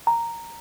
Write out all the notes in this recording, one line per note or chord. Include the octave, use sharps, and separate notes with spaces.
A#5